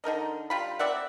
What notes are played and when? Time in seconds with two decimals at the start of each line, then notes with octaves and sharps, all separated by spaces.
0.04 D3 D#4 A#4 D#5
0.50 G3 F4 B5
0.79 C4 D5 E5 F#5